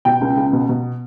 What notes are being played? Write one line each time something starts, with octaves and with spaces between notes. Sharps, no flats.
B2 G5
C#2
C#2
B2
B2